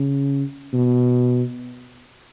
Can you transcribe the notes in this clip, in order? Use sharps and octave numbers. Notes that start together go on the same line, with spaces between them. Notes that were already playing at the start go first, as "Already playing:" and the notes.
Already playing: C#3
B2